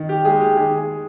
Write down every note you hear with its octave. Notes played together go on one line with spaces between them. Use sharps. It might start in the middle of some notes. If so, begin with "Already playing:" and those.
Already playing: D#3
G4
G#3 G#4
G4
D#3 G#4
G#4